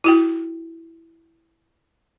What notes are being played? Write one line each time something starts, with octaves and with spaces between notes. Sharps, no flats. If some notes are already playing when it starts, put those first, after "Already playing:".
E4 F#4 G5